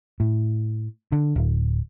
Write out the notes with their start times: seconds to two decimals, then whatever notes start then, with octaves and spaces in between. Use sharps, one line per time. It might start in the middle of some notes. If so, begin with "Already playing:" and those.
0.20 A2
1.12 D3
1.36 D1